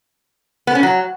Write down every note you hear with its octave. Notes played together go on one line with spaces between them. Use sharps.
B3
C#4
F#3